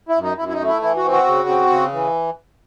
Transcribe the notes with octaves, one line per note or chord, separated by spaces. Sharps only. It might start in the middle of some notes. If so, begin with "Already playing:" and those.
E4
F#2
D#4
F#2 E4
E4
D#4
A3
E4
E3 E4
F#4
C4
F#4
C#3
C4
C#3
E3